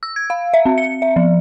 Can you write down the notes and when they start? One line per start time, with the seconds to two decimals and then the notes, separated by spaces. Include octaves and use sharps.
0.03 E6
0.16 G#6
0.30 F5
0.54 E5
0.66 C4
0.78 C#7
1.02 E5
1.16 F3